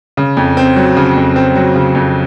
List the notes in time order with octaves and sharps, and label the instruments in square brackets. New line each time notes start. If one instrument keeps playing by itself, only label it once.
[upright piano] C#3
F2
C4
F#3
C#3
F2
C4
F#3
C#3
F2